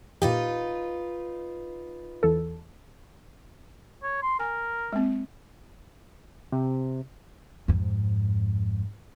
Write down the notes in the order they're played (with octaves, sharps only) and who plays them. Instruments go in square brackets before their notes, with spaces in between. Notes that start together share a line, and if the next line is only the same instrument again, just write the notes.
[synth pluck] A#2 G4 [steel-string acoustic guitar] D#4 F4 B4
[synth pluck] E2 A4
[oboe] C#5
C6
[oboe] A#4 [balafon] G#5
[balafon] G#3 A#3 C4
[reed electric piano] C3
[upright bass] F2 G#2